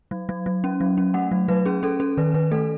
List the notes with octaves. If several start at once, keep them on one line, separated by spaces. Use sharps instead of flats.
F#3
F#3
F#3
C#4
F#3
C#4
A3 F#5
F#3
F#3 B4
C#4 G#4
C#4 A4
C#4 A4
D#3 B4
D#3 B4
A3 A4